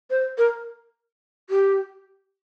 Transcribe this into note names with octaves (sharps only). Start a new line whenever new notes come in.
C5
A#4
G4